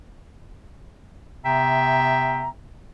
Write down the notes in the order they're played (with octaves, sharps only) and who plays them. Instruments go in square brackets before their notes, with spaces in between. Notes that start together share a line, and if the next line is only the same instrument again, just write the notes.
[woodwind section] C3 B3 E5 G5 A#5